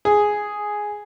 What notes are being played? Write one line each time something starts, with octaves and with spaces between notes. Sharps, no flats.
G#4